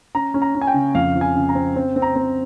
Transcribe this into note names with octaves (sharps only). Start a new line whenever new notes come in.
C#4 A#5
C#4
A#5
C#4
G#5
G5
C#3
F2 F5
F3
G#5
C#3
A#5
C4
C4
C4
A#5
C4